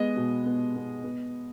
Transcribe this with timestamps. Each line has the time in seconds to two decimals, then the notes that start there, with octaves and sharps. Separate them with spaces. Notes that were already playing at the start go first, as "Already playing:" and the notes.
Already playing: G#3 B3 D#5
0.16 B2
0.46 B3
0.76 B3
1.04 B3